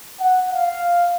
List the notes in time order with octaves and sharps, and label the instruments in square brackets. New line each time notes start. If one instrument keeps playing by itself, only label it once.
[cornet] F#5
F5